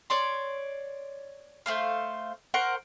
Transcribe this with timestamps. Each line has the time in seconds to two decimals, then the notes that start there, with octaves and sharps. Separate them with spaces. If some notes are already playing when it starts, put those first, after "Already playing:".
0.10 C#5 D5 C6
1.66 A3 C5 F5
2.54 A#4 C5 F#5 C#6